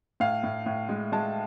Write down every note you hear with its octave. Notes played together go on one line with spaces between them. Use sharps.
A2 F5
A2
A2
G#3
G#3 A5